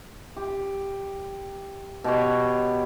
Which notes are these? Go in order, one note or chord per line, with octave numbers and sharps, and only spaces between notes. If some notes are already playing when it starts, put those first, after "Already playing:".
G4
B2 G4 C#5